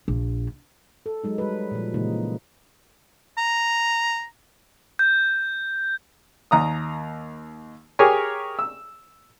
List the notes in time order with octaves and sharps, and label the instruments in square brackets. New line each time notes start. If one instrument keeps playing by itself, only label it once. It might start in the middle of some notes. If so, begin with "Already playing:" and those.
[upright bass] A#1
[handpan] A4
F#3 G#3 D#4
G3 B4
A#2 F3
A#2 C#3 E3 G#3 A#3 D#4
[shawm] A#5
[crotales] G6
[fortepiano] D#2 A#5 D#6
G4 G#4 A#4 C#5 G#5
E6